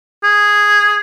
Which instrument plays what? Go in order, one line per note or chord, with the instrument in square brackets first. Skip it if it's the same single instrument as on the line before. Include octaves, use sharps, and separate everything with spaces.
[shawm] G#4